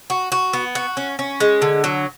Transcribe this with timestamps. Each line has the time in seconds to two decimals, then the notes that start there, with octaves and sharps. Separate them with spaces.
0.10 F#4
0.32 F#4
0.53 B3
0.75 F#4
0.97 C#4
1.19 C#4
1.40 G#3
1.62 D3
1.84 F#3